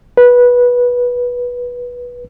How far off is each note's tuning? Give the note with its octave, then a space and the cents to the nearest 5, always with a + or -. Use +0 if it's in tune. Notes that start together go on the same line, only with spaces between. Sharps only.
B4 -15